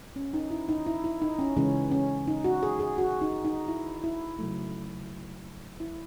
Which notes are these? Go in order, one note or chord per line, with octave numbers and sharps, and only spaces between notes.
C#4
D#4
E4
D#4
E4
E4
D#4
C#4
C#3 E3 G#3 C#4
C#4
D#4
F#4
G#4
G#4
F#4
D#4
D#4
E4
E4
C#3 F#3 A3
E4